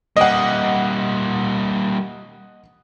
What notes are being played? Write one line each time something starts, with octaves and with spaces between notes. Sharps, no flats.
G3 A#3 D#5 F#5